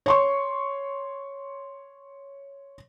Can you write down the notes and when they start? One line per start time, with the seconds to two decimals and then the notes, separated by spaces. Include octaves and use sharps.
0.06 C#5 C6 C#6